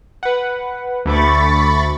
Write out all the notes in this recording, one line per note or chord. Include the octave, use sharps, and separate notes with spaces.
B4 F#5
D2 A3 B5 C#6 D6 A6